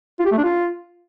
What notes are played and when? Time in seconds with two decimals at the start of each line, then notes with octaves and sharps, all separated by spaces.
0.19 F4
0.26 G4
0.32 A3
0.38 D4
0.44 F4